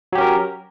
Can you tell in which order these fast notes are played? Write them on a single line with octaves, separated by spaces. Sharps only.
F#3 G4 C#4 A#4